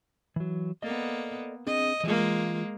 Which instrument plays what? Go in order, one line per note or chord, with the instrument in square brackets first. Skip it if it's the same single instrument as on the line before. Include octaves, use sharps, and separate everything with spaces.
[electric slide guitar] E3 F#3
[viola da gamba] A#3 B3 [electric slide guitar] A4 D5 D#5
[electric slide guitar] C4 D4 G#4 [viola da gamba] D#5
[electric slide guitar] E3 F4 [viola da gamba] G#3 A#3